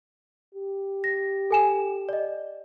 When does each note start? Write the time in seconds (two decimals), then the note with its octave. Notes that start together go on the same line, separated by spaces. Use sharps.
0.55 G4
1.04 A#6
1.51 A4 G#5 E7
2.09 D5 D#5